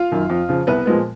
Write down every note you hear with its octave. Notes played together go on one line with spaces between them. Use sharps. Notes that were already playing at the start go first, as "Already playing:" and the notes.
Already playing: F4 F5
F#2 D#3
F2
C#3 F3
C2 B3 B4
A#2 F3 G#3 B3